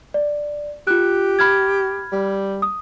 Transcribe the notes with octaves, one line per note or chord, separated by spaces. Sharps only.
D5
F4 G4 F#6
B5 F6 G#6
G3
D#6